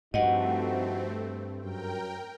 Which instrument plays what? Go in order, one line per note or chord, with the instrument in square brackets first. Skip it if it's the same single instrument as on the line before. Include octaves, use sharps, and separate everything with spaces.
[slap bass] G2 [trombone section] F3 D#4 F#4 [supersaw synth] A3 C4 [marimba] D#5 F#5
[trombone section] F#2 [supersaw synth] A#4 G5